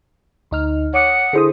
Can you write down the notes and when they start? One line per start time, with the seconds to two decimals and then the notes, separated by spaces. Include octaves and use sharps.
0.51 D2 D#4 F6
0.94 C#5 F#5 D6 D#6
1.33 D3 E4 G#4 A4 C5 D#6